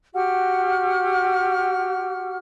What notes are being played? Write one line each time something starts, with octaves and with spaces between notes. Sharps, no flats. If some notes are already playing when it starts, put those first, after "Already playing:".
F#4 G4 F#5 F6